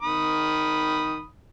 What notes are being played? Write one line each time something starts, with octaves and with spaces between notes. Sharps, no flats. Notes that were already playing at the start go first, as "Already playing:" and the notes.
D#3 B5 D#6